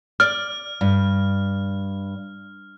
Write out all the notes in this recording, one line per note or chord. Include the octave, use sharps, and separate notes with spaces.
D5 F6
G2